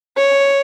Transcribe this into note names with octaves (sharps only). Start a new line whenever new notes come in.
C#5